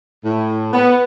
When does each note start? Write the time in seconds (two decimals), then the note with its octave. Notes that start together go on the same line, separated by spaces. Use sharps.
0.24 A2
0.73 B3